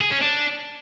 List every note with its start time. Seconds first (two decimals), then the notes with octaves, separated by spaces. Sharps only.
0.01 G#4
0.11 C#4
0.21 D4